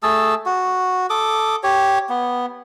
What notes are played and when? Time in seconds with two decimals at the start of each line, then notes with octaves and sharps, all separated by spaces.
0.03 A3 G#4 A5 E6
0.46 F#4
1.10 A4 D6 D#6
1.63 G4 C#5
2.09 B3